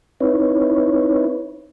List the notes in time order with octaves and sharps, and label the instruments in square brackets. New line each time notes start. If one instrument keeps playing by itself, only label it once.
[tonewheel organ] C4 D#4 E4 B4 C#5